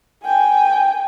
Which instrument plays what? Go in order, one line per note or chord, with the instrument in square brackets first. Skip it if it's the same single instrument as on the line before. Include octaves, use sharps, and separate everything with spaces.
[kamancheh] G5 G#5